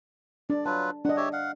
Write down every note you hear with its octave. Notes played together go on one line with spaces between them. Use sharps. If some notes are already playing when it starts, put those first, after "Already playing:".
D4 D5
F#3 F4 B4 A5
D4 D#5 F#5
G4 C#5 E5
F5 F#5